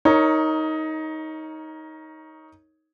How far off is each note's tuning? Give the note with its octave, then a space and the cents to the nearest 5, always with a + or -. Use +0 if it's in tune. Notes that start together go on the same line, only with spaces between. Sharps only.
D#4 +15 A#4 -5 C#5 +0